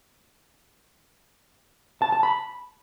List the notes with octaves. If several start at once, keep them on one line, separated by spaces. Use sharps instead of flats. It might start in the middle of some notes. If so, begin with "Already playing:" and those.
A5
A5
B5